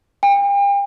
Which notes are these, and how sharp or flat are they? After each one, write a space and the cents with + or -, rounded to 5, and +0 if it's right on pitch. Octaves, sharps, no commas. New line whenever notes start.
G5 +40